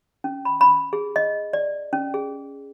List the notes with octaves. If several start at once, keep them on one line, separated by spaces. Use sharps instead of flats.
C#4
B5
B5
G#4
D#5
D5
C#4
G#4